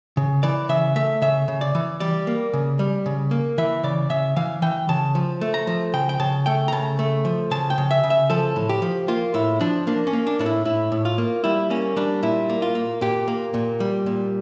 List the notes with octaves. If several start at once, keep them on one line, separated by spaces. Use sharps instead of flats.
C#3
E3 D5
C#3 E5
A3 E5
C#3 E5
C#3
D5
E3
G3 D5
A#3
C#3
G3
C#3
A#3
E3 E5
C#3 D5
C#3 E5
E3 F5
E3 G5
C#3 A5
F3
A3
A#5
F3
C#3 G5
G5
C#3 A5
A3 G5
A#5
C#3 A5
A3
F3
C#3 A5
G5
C#3
E5
C#3
E5
F3 A4
A2
G4
F3
A#3 F4
A2 E4
F3 D4
A#3 D4
C#4
A#3
D4
A2 D4
E4
A2 E4
A2
F4
A#3
G3 E4
A#3 C#4
G3 D4
A#2 E4
A#3
F4
A#3
A#2 G4
A#3
A#2
G3
A#2